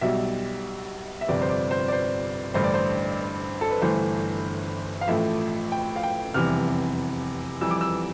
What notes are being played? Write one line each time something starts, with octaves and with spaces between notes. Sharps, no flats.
B1 B2 G3 E5
E5
G1 F2 C3 G3 D5
C5
D5
C5
D5
C5
A1 G2 D3 A3 C5
D5
C5
A4
B4
G1 G2 E3 A3 C5
F5
A1 A2 F3 A3 E5
G5
F5
G5
F1 E2 C3 E3 G3 F6
F2 E3 G3 E6
D6
E6